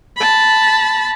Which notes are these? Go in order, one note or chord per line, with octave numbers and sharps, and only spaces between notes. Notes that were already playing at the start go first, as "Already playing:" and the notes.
A5 B5